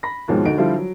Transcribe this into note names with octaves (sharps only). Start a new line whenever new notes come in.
B5 A#6
D#2 G#2 B2 F3 G#3 C#4
D2 D#4 F#4 D7
D3 F3 G3 E4 F4 C5
F#3